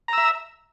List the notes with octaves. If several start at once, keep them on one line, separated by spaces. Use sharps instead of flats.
E5 A#5 E6